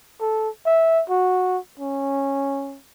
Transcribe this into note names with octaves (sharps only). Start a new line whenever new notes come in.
A4
E5
F#4
C#4